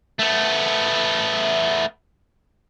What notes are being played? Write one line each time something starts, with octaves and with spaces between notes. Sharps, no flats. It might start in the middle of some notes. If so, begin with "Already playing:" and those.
A3 B3